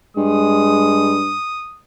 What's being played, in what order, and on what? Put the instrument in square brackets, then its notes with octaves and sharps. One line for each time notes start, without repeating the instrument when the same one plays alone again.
[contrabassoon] G2 [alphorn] G#3 [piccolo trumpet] D#6